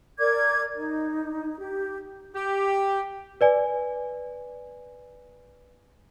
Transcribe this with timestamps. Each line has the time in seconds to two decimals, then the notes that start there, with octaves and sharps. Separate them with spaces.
0.19 A#4 D5 D6 G#6
0.74 D#4
1.59 G4
2.35 G4
3.41 B4 D5 G#5